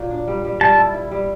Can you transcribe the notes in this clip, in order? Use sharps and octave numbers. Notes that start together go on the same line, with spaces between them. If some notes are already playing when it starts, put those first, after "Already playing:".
Already playing: A#2 F#3
D4
G3
G3
G3 A5
E4
E4
G3